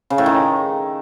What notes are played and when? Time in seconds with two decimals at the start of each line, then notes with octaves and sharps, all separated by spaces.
0.10 C#3
0.18 A2
0.26 D#3